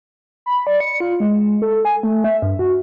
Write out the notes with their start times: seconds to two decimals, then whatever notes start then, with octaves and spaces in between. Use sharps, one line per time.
0.46 B5
0.67 D5
0.80 C#7
1.00 F4
1.20 G#3
1.62 A4
1.85 G#5
2.03 A3
2.24 E5
2.42 G2
2.59 F#4